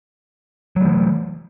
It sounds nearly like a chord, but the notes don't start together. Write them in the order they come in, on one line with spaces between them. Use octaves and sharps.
F#3 A3 E3